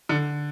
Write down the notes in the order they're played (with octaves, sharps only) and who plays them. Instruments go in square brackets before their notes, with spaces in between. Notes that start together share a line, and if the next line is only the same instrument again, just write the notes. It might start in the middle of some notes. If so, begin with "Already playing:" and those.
[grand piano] D3